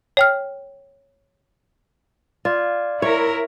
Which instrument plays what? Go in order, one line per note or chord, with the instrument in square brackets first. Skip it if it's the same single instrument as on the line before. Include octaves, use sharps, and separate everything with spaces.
[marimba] C#5 G5 F6
[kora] F4 [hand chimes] D5
[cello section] E4 A#4 [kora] C#5